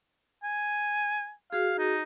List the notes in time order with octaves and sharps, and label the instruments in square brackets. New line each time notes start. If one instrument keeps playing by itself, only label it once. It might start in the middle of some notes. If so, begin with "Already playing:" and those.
[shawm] G#5
[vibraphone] F#4 G#4 [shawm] F5
[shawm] D#4